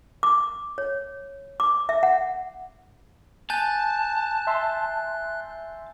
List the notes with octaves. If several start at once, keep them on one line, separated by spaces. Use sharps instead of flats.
D6
C#5
D6
E5
F#5
G#5 A5 F#6 G6 A6
E5 C6